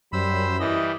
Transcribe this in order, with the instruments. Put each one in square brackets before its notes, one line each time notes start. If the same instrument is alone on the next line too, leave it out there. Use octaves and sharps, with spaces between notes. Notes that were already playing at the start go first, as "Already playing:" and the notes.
[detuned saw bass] F#2 [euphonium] G3 [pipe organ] C5 E6 [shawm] B5
[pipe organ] E3 G3 [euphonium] E4 [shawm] D#5